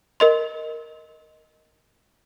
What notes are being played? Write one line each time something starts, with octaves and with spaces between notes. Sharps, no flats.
A#4 D#5 C6